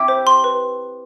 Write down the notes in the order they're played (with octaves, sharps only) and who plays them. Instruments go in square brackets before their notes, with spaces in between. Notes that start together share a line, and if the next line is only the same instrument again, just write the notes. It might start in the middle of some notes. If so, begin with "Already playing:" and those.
Already playing: [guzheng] C4 E4 G4
[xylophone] C5
C6
B4